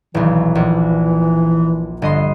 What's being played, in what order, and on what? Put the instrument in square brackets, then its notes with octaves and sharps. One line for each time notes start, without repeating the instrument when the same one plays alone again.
[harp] D#1 B1 [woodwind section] E3
[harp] A#1
[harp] G1 D#5 C6 [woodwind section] D4